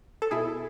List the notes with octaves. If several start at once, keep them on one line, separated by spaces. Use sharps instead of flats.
A4
B2 E4 G#4